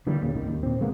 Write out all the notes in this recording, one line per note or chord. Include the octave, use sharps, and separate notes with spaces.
D3 E3 G3 A#3
D#2 A#2 C#3
G#1 C#2 D#3
D#2
A#2 C4
C#2 G#3 A#3 B3